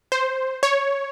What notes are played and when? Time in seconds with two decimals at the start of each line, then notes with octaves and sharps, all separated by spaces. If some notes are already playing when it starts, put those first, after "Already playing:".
0.12 C5
0.63 C#5